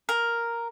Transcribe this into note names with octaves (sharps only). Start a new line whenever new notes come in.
A#4